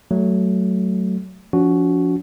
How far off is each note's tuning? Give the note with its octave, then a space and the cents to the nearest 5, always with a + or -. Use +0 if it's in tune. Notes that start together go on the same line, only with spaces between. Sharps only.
F#3 +15 A3 +0
F3 +0 C#4 +45 F#4 +0